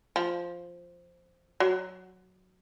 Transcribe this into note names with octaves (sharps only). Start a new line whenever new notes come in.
F3
F#3